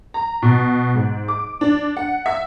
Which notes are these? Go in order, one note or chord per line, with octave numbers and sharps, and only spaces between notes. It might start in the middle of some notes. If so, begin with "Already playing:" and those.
A#5
B2
G#2
D6
D4
F#5
E5